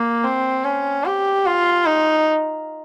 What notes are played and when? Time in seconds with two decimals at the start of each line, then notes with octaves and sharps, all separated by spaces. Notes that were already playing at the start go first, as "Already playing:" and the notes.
Already playing: A#3
0.24 C4
0.65 C#4
1.06 G4
1.46 F4
1.86 D#4